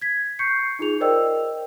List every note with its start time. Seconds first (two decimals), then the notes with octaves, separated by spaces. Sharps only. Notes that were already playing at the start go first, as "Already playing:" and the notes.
0.02 G#6 B6
0.39 C#6 G6 C7 C#7
0.79 D#4 F4 G#4 F7
1.00 A#4 C5 D5 D#5 G5 E6